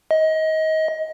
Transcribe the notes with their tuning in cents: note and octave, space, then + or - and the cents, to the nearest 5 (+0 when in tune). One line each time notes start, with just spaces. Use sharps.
D#5 +25